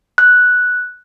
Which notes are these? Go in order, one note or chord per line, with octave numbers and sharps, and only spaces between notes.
F#6